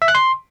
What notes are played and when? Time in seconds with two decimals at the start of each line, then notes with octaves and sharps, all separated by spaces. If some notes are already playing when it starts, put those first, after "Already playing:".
0.02 E5
0.08 F#6
0.15 C6